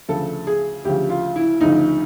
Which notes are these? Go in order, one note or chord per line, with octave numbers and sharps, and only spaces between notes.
D2 C#3 F3 A4
G#4
D2 C#3 F3 G4
F4
E4
D2 C#3 F3 D#4